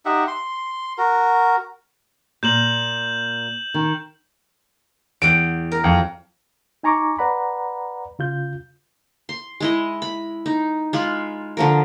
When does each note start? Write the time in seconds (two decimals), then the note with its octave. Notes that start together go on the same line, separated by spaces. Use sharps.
0.05 D#4 G4 E5 F#5
0.28 C6
0.98 F#4 A#4
2.43 A#2 G6 E7 F#7
3.74 D#3
5.22 E2 F#5 G5 D7
5.72 A#4
5.84 F2
6.83 D#4 G#5 A#5 C#6 D6
7.18 B4 D5 F#5 A#5 B5
8.19 C#3 F4 G6
9.29 C6
9.60 G#3 E4 D#5
10.02 B5
10.46 D#4
10.93 G#3 F4 B5
11.57 D3 F3 A#4